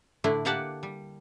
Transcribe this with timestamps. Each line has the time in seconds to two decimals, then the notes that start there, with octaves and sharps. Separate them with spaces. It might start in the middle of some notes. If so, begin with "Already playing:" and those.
0.24 A2 D3 A3 D4 E4
0.45 A#3 D4 G4 D5 F#5 A5
0.83 G3